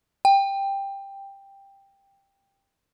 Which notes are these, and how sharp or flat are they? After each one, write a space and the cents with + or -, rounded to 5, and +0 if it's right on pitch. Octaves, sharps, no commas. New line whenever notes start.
G5 +10